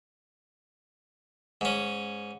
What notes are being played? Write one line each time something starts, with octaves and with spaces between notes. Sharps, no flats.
G#2 C#4